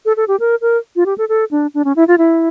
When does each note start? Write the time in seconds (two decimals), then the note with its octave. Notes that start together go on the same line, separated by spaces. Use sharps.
0.05 A4
0.17 A4
0.28 G4
0.40 A#4
0.61 A#4
0.96 F4
1.06 G4
1.18 A4
1.29 A4
1.51 D4
1.74 D4
1.85 C#4
1.96 E4
2.08 F4
2.18 E4